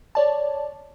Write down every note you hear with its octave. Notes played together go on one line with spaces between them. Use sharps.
C#5 D5 A5